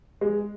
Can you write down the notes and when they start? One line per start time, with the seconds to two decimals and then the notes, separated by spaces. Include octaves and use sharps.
0.21 G#3